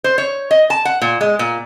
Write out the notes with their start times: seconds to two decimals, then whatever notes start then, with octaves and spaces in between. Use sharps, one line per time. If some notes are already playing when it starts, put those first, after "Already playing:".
0.04 C5
0.18 C#5
0.51 D#5
0.70 A5
0.85 F#5
1.02 A#2
1.21 G#3
1.39 A#2